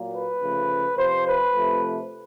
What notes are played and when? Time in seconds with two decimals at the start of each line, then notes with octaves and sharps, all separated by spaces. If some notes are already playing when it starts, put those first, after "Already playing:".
Already playing: A#2 F#3 A#3
0.13 B4
0.41 C#3 F3 A3
0.97 F2 C3 F3 C5
1.25 B4
1.54 C3 F3 A3